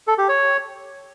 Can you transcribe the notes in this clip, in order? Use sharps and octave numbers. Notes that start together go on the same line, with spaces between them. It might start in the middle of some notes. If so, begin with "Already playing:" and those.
A4
G4
C#5